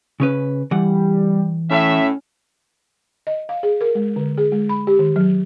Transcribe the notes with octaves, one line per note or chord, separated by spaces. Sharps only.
C#3 C#4 B4
E3 G3 F#5
A2 C#4 E5
D#5
F5
G#4
A#4
G#3
D3
G#4
G#3
B5
G4
D#3
F#3